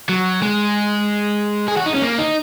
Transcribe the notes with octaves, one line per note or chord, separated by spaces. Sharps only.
F#3
G#3
G#4
F#4
D#4
C#4
A#3
D#4